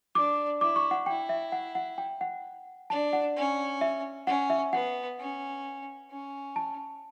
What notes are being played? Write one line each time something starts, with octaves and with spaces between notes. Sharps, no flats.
D4 D6
E4 D6
C#6
F#5
E4 G5
E5
F#5
F#5
G5
F#5
D4 A5
F#5
C#4
E5
C#4 F#5
E5
B3 F#5
C#4
C#4
A5